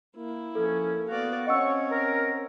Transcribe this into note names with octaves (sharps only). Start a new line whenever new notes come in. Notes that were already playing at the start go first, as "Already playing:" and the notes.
A#3 E4
C#2 F3 C#4 A4
B3 F#4 D5 F5
C4 C#4 C#5 D#5 F#5 C#6 E6
A#4